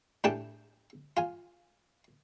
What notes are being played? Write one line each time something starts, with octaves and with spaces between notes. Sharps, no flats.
A2 D4 G4 G#5 A5 D6
F4 G#5